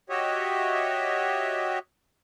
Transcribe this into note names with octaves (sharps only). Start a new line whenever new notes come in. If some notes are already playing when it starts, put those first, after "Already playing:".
F#4 G4 C#5 D#5 E5